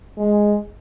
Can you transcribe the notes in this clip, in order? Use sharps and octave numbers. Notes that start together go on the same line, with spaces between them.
G#3